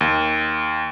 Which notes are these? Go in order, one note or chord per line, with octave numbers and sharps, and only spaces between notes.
D#2